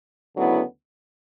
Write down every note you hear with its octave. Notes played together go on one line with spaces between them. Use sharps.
D2 C#3 F#3 B3 E4